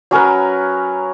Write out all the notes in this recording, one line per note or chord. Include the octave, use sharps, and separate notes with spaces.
F#3 C#4 A#4 B4